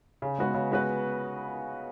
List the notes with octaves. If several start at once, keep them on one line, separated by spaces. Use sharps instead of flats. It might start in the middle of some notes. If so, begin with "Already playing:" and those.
C#3
G#3 B3 F#4 B4
C#3
G#3 B3 F#4 B4